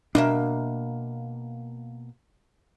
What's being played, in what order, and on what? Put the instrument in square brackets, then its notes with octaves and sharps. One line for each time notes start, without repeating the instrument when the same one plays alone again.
[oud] B2 A#3 E5 [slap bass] D4